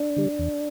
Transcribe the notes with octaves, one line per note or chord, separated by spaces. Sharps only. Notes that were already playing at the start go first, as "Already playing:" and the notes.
Already playing: D4
D3 G3
E2